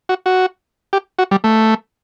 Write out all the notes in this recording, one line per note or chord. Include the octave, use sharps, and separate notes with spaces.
F#4
F#4
G4
F#4
G3
A3